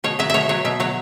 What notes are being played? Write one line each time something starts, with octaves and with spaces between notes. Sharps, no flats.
B2 C#5
F#3 E5
B2 C#5 E5
F#3 C#5
B2 E5
F#3 C#5